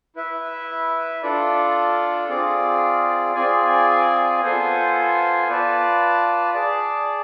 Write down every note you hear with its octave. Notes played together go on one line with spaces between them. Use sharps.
E4 B4 E5
D4 F4 A4 D5
C4 F4 G#4 D5
C4 F4 G#4 D5 G#5
B3 F4 A4 C5 G#5
F4 B4 D5 A5
G#4 D5 A5